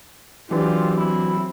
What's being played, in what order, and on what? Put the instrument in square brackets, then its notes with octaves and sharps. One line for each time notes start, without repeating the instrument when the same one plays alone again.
[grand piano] E3 D4 B4 [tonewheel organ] F#3 [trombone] C4 [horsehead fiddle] F4 G4
[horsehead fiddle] C4 [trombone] E4